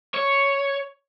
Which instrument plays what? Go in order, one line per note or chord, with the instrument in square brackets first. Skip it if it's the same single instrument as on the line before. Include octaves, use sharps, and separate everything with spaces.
[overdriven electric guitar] C#5